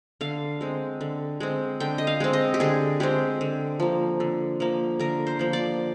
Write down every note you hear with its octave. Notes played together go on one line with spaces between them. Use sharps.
D3 F5
G#3 C4
D3
G#3 C4
D3 G5
D#5
F5
G#3 C4
D#5
G4
D3 G#4
G#3 C4 G4
D3
F3 A#3
D3
F3 A#3
D3 A#4
C5
F3 A#3
D5